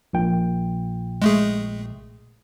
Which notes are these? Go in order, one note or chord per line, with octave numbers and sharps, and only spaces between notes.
A#1 A#2 G5
G#3 A3 G#4